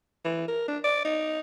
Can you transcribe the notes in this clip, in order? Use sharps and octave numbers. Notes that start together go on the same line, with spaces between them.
E3
A#4
D4
D5
D#4